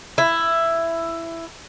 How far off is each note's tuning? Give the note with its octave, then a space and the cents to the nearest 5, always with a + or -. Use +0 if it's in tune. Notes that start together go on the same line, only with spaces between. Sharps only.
E4 +10